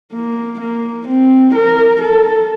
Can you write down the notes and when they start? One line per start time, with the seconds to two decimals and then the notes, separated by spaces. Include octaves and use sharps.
0.12 A#3
0.60 A#3
1.08 C4
1.55 A#4
2.02 A4